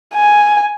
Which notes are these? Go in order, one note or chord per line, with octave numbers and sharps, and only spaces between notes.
G#5